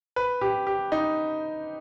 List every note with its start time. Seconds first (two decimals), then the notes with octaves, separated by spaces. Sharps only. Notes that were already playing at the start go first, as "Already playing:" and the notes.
0.16 B4
0.41 G4
0.67 G4
0.92 D#4